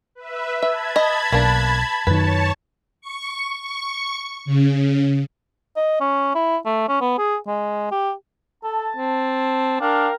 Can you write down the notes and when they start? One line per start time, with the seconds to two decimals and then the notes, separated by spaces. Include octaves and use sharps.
0.15 B4 E5
0.62 E5 A5 B5 G#6
0.96 D#5
1.32 B1 A#3 D4
2.07 F#2 D#3 B4 C#5 A5 C#6
3.01 C#6
3.59 C#6
4.45 C#3
5.77 D#5
6.01 C#4
6.35 E4
6.66 A3
6.89 C#4
7.01 B3
7.18 G#4
7.47 G#3
7.91 G4
8.64 A4 A5
8.97 C4
9.80 D4 A#4 F5 G5